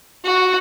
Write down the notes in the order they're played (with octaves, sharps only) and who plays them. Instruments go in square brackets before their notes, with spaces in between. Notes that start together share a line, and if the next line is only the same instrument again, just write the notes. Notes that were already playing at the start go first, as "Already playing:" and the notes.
[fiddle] F#4